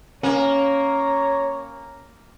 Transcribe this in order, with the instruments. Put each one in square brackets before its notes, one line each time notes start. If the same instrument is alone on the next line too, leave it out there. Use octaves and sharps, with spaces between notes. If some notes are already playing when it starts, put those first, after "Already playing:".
[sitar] A#3 [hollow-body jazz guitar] C#4 [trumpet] C#5 [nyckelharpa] A#5